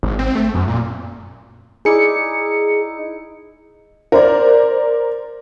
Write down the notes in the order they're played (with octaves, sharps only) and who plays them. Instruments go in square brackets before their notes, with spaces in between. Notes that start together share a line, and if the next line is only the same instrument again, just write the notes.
[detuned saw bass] G#1
C4
A3
F#2
A#2
[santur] D#4 E4 D5 [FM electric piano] G#4 C#7
[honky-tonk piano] A#4 C5 D5